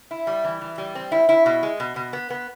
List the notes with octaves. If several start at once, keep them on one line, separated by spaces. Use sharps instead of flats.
E4
G3
E3
E3
G3
C4
E4
E4
B2
G#3
B2
B2
B3
B3